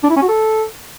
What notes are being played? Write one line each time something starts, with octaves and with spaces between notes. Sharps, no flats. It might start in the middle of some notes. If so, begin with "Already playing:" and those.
D4
E4
C#4
F#4
A4